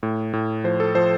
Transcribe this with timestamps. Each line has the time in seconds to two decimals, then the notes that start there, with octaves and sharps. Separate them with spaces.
0.03 A2
0.33 A2
0.64 F3 C5
0.80 A4
0.95 F3 C5